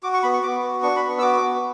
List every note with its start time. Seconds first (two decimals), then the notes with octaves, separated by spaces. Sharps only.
0.03 F#4 D6
0.14 C#6
0.23 B3 B5
0.33 C#6
0.43 B3 D6
0.63 F#4
0.83 D4 C#6
0.96 B5
1.03 B3
1.09 C#6
1.19 E6
1.22 F#4 D6
1.42 B3